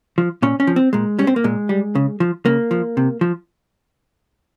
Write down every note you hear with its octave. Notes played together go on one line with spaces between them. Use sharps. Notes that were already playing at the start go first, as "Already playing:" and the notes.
F3
A#2 C#4
C#4
F3
C4
A#2 G#3
G3 C#4
C4
A#3
A#2 G#3
G3
C#3
F3
C#3 A#3
F3
C3
F3